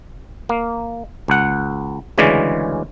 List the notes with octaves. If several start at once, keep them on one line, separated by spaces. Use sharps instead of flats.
A#3
C#2 F#5
D2 C#3 E3 G#3 C#4 D5